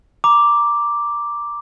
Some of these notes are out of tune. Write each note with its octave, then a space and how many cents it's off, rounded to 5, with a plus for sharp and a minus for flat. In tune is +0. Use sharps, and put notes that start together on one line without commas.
A#5 +15 D6 +0